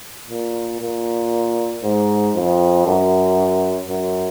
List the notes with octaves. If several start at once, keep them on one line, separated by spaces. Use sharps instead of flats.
A#2
A#2
G#2
F2
F#2
F#2